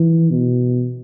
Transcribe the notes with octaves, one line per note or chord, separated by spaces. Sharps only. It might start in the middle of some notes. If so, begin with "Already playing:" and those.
Already playing: E3
B2